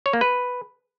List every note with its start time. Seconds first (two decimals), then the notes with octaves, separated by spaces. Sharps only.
0.06 C#5
0.13 A#3
0.21 B4